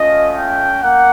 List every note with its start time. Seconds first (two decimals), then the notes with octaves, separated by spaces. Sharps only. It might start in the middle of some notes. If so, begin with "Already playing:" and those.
Already playing: A3 C#4 F4 D#5
0.34 G5
0.82 A#3 F#5